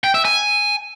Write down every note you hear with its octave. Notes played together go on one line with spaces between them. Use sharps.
G5
E5
G#5